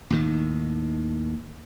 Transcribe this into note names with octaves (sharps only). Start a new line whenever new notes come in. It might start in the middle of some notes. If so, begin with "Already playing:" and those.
D#2 A2 D#3